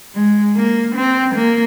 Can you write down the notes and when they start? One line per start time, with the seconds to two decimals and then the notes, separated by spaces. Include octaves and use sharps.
0.15 G#3
0.56 A#3
0.96 C4
1.35 A#3